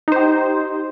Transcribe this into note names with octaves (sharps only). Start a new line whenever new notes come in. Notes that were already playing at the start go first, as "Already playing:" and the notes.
D#4 G4 C5